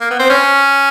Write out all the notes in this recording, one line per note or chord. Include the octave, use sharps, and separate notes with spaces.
A#3
B3
C4
C#4